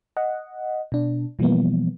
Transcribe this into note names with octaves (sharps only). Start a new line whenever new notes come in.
D#5 F#5
B2 D4
B2 E3 F3 G3 A#3 B3